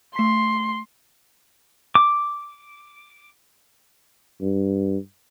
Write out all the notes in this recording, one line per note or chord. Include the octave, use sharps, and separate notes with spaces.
A3 C6 B6
D6
G2